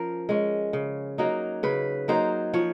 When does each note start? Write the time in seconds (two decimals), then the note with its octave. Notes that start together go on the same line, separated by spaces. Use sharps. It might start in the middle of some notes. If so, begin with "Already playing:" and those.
Already playing: F3 C#4 A#4
0.29 G#3 C#4
0.73 C#3
1.18 F#3 A#3 D#4
1.63 C#3 B4
2.08 F#3 A#3 D#4 C5
2.54 F3 C#5